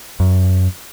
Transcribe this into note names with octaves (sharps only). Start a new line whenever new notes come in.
F#2